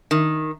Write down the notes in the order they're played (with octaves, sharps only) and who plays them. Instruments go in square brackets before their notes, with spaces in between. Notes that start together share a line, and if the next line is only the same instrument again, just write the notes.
[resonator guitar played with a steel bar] D#3